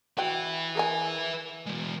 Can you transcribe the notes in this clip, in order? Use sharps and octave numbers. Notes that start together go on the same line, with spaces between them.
F#4 B4 E5 G5
G#4 A#4 G#5
E3 G#3